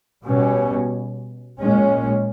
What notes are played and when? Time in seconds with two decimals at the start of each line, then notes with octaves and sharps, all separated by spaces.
0.24 B2 G3 C#4
1.59 A#2 G#3 C#4